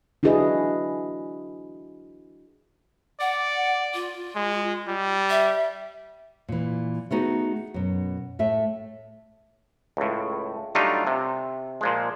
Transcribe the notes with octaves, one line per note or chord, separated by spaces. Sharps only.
D4 E4 F#4 G#4 B4 D#5
D5 F#5
F4
G#3
G3
E5
A#2 E3
A3 B3 D#4 F#4 G#4
F#2 B2
A2 A3 E5
C#2 A2
F#3 G3 A3 D4 D#4 F4
C3
A#2 F3 G#3